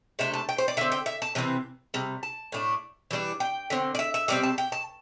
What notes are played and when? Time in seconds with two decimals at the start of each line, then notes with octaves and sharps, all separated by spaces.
0.19 C3 A3 D4 E5
0.34 A5
0.49 G5
0.58 C5
0.68 D5
0.77 D3 C4 E5
0.92 G5
1.06 E5
1.22 A5
1.35 C3 E3 C4
1.94 C3 G3
2.23 A5
2.52 A2 A3 D4
3.11 E3 G3 D4
3.40 G5
3.70 D3 C4
3.95 D5
3.99 E5
4.14 E5
4.28 C3 G3 C4 D5
4.43 A5
4.58 G5
4.72 A5